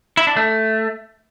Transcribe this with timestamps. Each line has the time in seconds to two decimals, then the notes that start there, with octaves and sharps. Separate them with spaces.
0.17 E4
0.27 D4
0.37 A3